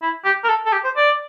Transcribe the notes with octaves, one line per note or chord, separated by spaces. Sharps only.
E4
G4
A#4
A4
A4
G4
C5
D5